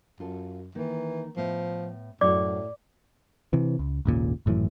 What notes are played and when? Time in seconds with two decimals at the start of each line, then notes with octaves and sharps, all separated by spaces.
0.20 F#2 F4 A4
0.75 D#3 E3 A#3
1.37 A2 F3 B3
2.21 F#2 A2 F#4 C#5 D5 D6
3.53 C3 E3
3.79 C#2
4.05 G#1 D#2 A#2 C#3
4.46 G#1 F#2 A2 E3